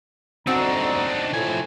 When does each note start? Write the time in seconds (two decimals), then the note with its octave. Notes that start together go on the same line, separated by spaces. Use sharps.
0.47 G1 D2 C4 D4 D#4 F#4 A#5
1.33 A2 F3 G#5